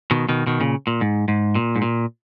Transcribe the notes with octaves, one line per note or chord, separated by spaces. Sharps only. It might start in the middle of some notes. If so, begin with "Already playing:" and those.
B2 D#3
B2 D#3
B2 D#3
A#2 C#3
A#2
G#2
G#2
A#2
G#2
A#2